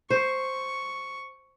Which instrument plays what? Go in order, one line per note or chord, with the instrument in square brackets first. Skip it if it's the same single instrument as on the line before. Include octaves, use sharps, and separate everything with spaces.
[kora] C5 [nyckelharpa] C#6